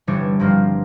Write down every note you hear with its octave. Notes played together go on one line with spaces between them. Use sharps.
G1 C3 E3 G3 D4 C#5
G2 F3 A#3 C4 F4